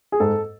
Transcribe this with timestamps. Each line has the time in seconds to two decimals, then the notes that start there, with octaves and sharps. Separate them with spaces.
0.12 G#4
0.20 G#2 A4